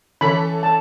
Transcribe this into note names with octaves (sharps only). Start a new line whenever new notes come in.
E3 C#4 A4 B5
A5